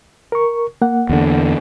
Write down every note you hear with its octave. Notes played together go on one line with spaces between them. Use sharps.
A#4 C#6
A#3 F#5
E2 D3